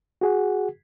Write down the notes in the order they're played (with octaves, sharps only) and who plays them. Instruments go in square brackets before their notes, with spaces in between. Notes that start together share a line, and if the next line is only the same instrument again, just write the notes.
[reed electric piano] F#4 G#4 F#5